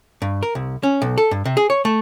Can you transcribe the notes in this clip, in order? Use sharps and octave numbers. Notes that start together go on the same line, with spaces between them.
G2
A#4
C2
C#4
B1
A4
G2
C3
G#4
C#5
A3